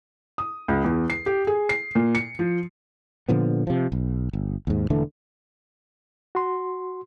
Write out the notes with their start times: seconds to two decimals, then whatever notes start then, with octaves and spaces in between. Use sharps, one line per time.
0.38 D#6
0.68 C#2
0.84 E2
1.10 C7
1.26 G4
1.47 G#4
1.69 C7
1.95 A#2
2.15 C#7
2.39 F3
3.29 A#2 D3 F3 B3
3.67 C3 F3
3.92 B1
4.33 G1
4.67 D#2 G#2
4.90 E1 D3 E3 A3
6.35 F#4 C6